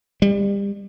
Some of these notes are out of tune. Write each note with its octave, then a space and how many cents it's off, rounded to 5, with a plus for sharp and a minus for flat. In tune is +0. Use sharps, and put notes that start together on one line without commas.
G3 +30